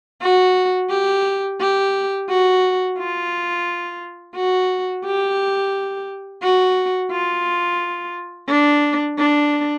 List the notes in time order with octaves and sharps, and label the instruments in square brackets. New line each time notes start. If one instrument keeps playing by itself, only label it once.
[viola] F#4
G4
G4
F#4
F4
F#4
G4
F#4
F4
D4
D4